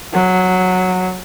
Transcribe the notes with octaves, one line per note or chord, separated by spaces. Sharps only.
F#3